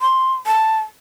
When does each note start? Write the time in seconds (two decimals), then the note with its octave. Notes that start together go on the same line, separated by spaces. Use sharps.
0.01 C6
0.47 A5